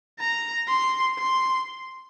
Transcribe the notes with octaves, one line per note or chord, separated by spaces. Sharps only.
A#5
C6
C6